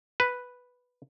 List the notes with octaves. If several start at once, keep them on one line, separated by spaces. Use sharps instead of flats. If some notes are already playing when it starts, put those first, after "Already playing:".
B4